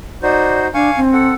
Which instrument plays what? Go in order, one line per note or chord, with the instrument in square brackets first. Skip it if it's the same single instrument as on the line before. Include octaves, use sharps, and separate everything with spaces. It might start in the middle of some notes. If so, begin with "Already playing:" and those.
[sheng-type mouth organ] D#4 F#4 C5 [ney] D5
[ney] D4 [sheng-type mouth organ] F5 G#5 C#6
[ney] C4
[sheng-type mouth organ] A4 F#5